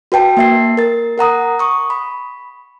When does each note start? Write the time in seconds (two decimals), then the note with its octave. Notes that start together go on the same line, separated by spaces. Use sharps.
0.12 F#4 B4 G5 A5
0.37 A#3 E5 C7
0.77 A#4 A6
1.18 A#4 F#5 A#5 D#6
1.59 C#6 D#6
1.90 B5